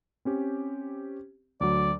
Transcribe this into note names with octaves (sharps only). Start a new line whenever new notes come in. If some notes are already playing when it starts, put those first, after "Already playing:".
C4 C#4 G4
D2 F#3 D5